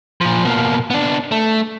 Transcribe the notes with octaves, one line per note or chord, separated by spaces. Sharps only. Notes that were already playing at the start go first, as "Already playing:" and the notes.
A#2 F3
B2 A#3
B3 D4
A3